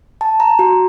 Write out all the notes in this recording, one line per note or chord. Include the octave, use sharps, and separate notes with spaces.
A5
A#5
F#4